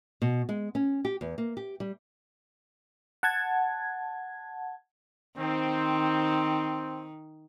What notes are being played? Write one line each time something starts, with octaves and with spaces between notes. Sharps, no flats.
B2
G#3
C#4
G4
E2
A#3
G4
G3
F#5 A5 G#6
D#3 C4